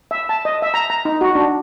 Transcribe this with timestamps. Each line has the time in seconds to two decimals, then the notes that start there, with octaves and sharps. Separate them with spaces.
0.11 E5
0.29 A5
0.45 D#5
0.62 E5
0.74 A#5
0.90 A#5
1.05 D#4
1.21 F#4
1.35 D4